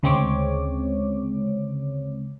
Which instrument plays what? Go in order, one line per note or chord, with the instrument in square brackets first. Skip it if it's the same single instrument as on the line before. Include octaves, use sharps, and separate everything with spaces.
[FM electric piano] D2 C#3 G#3 C4 C#5 D6